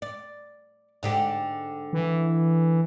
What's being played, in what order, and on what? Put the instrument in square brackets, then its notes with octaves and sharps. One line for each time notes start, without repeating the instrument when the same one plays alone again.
[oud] D5
G#2 D3 G4
[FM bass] E3